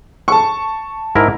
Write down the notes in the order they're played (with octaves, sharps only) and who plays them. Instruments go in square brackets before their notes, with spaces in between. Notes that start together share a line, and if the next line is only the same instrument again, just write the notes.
[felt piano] A5 C#6
[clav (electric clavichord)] G#2 E4 A#4